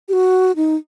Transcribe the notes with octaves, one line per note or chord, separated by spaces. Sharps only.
G4
F#4
D#4